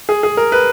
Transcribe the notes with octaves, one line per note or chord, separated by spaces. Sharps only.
G#4
G#4
A#4
B4